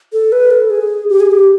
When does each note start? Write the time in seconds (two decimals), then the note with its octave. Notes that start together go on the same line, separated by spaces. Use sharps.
0.13 A4
0.32 B4
0.51 A4
0.70 G#4
1.09 G4
1.20 G#4
1.32 G4